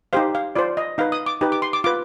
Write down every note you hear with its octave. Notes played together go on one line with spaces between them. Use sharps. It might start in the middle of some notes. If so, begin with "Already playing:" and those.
D#4 G4 C5 F5
F5
F4 C5 D5
D#5
D#4 B4 F5
D#6
D6
D#4 G4 B4
D6
C6
D6
F4 B4 D6